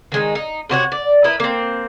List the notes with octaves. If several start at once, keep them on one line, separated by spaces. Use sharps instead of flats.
D#3 G#3 D#4
D#4
C3 F#4 C#5 F#5
D5
E4 A#4 B4 D#5
A#3 C4